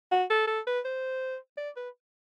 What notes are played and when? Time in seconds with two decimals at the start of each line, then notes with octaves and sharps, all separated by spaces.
0.12 F#4
0.30 A4
0.47 A4
0.67 B4
0.85 C5
1.57 D5
1.76 B4